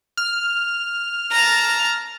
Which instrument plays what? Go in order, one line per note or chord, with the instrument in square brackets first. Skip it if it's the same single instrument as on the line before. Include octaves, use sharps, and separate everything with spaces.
[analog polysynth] F6
[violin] A5 A#5